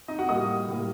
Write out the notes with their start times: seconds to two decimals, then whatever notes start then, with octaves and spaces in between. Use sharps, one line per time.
0.08 D#4 D#5
0.19 F#4 F#5
0.28 A2 G3 A#3 D#5 D#6
0.68 A2 G3 A#3